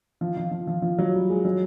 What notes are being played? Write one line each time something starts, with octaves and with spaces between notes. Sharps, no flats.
F3
F3
F3
F3
F3
F#3
G3
G#3
F#3